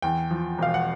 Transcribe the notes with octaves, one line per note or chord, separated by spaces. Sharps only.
E2 G5
F3
E1 F5
F#5